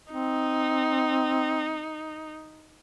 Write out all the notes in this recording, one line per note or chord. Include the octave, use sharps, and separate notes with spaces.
C4 D#4